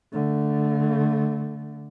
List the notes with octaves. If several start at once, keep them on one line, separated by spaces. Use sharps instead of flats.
D3 A3